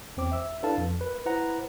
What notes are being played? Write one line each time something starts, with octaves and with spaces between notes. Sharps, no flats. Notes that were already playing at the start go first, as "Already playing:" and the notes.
E2 C4 D6
E5 E6
D4 E4 A4 B4 F5 A5
F2
A#4 B4
E4 B4 C5 F#5 A#5